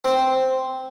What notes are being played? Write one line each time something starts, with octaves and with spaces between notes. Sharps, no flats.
C4